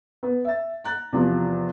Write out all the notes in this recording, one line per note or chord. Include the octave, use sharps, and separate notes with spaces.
B3
E5 A6
A#5 F#6 A6
E2 C3 F3